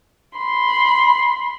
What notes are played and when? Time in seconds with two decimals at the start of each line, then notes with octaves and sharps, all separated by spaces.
0.37 B5 C6